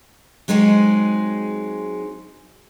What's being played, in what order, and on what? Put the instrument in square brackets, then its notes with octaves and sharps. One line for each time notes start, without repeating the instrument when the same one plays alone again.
[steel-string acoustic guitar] F#3 G#3 C4 D#4 G#4